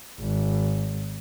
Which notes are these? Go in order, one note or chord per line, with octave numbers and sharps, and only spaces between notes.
G#1